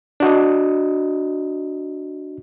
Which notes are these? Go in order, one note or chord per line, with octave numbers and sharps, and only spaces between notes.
D4 F#4 D#5